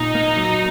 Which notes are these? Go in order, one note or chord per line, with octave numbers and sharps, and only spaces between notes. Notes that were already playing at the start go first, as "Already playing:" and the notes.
Already playing: A#2 D#4
A#3
F#3